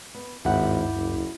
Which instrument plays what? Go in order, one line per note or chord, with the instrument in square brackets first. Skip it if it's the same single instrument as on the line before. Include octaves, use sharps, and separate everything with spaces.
[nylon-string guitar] B3
[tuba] G#1 [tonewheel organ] D2 G2 [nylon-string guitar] E4 E5 F#5
[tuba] F#1